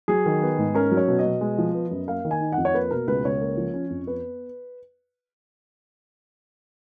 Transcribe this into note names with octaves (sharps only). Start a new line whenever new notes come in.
F#3 G#4
D#3
B3
G#2
C#4 A#4
F#3
C#5
B2
D#5
B2
G#3
F3
B3
F#2
A#3 F5
D#3
G#5
D#4
F#5
F2
C#5
A#3 B4
B2 A#4
C#2 B4
C#2 C#5
A#3
F3
C#4
F2
B3 B4